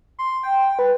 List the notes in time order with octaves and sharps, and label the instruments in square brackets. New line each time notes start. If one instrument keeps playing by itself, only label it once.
[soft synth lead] C6
G5
B4